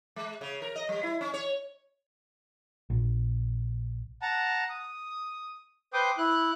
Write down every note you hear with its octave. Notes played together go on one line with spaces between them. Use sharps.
G#3
C#3
A#4
D#5
G3
E4
C#4
C#5
A#1
F#5 A5 A#5
D#6
B4 C5 G5 C6 D6 D#6
E4 F#6